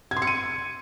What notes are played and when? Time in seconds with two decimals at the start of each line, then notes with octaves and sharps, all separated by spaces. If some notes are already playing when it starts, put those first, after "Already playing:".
0.11 G#6
0.17 C6
0.22 C#7
0.27 D#7